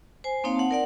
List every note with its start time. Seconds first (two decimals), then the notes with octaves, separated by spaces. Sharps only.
0.24 C5 G#5
0.44 A#3 C4 D#4 C#5 F5
0.55 F#5 A5
0.71 A#4 D5 F#5